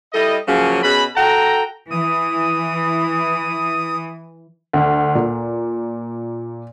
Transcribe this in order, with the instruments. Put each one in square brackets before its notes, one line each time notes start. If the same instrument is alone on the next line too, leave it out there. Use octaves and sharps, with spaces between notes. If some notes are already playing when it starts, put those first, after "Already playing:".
[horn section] G3 E4 A4 D#5
C#3 F3 F#3 A#3 C#4
B2 C#4 G#4 B5
F#4 A4 G5 A#5
[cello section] E3 [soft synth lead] D#6
[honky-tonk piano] D2
A#2